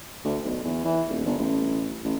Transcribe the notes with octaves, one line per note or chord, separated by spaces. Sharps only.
D2
B1
E2
E3
D#1
G1
A1
A1